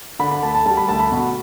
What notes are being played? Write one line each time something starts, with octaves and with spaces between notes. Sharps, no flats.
D3 B5
B5
D2 A5
A5
G3 A5
B5
D2 A5
B5
B2